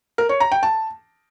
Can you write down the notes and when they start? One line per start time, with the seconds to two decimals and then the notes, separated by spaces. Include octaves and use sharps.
0.18 A#4
0.29 C#5
0.40 A#5
0.52 G5
0.63 A5